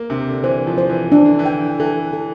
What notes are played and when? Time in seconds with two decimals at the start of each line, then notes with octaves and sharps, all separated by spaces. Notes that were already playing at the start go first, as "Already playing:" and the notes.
Already playing: A#3
0.10 C3 D4
0.28 D3
0.44 E3 C5
0.67 F3
0.78 C5
0.90 E3
1.12 E3 D4
1.25 D3
1.39 E3
1.46 G5
1.80 E3 A4
2.13 A4